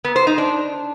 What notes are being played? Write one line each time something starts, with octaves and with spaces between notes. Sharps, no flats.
B3
C5
D#4
D4